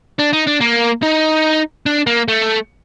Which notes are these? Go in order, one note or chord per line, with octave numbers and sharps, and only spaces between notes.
D4
D#4
D4
A#3
D#4
D4
A#3
A3